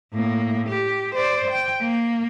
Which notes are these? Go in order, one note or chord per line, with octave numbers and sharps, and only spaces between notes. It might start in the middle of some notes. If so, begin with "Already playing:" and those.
A2 A#3
G4
C5 D5
G5
A#3